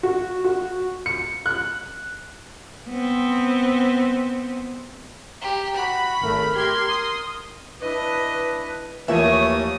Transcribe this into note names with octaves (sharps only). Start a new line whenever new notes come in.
F#4
F#4
C#7
F#6
B3 C4
G4 A#5
F#4 B5
G#1 A3 A#4
G4 C6 G#6
D#6
D4 E4 B4 D#5
D#2 E3 F3 A3 A#3 C#5 E5 D#6